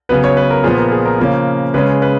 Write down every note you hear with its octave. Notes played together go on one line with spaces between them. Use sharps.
C#3 F#3 B3 B4
C#5
B4
A#4
A#2 F3 B3 G#4
A#4
G#4
A#4
C#3 F3 A#3 C#4
C#3 G#3 C#4 B4
B4